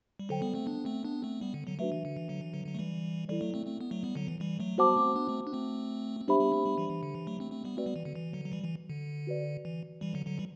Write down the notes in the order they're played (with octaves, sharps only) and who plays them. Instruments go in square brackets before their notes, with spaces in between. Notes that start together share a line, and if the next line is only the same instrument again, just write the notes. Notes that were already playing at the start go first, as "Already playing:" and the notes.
[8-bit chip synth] G3
[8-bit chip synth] D3 F#3 [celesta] A4 C5 G5
[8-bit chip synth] G3 B3
A3 C4
B3 D4
A3 C4
B3 D4
A3 C4
G3 B3
D3
D3 F#3
[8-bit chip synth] F#3 A3 [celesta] D4 F#4 B4 E5
[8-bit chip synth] E3
D3
E3
D3 F#3
E3
D3 F#3
D3 F#3
A3
E3 G3
[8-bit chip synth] E3 G3 [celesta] E4 A4 D5
[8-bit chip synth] F#3 A3
A3 C4
A3 C4
B3
F#3 A3
G3 B3
D3 F#3
E3
E3 G3
F#3 A3
[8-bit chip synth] G3 B3 [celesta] F#4 C5 F#5 A5 D6
[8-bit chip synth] A3 C4
B3 D4
A3 C4
D4
A3 C4
C4
[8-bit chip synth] G3 B3 [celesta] D4 G4 C5 E5 B5
[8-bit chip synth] G3 B3
A3 C4
G3 B3
E3 G3
E3
D3
E3
F#3 A3
A3 C4
A3 C4
G3 B3
[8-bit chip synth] A3 C4 [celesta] F#4 B4 D5
[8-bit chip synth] G3 B3
E3
D3
E3
D3 F#3
F#3
E3 G3
E3
D3
[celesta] F#4 B4 D5
[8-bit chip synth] E3
E3 G3
D3 F#3
D3 F#3
E3 G3